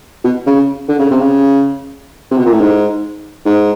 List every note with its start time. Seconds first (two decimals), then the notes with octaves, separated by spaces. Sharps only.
0.24 B2
0.46 C#3
0.89 D3
0.99 C#3
1.11 C3
1.20 C#3
2.31 C3
2.37 B2
2.45 A#2
2.52 A2
2.60 G#2
3.45 G#2